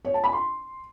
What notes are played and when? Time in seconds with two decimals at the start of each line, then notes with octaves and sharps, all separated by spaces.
0.05 C#5
0.14 A5
0.24 B5
0.33 C6